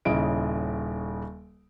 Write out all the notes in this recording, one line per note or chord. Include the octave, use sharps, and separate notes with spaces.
D#1 C#3 E4 D#5 D7